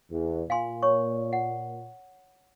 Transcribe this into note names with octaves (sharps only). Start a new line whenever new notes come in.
E2
A#2 F5 G#5 C6
C#5 C#6
F#5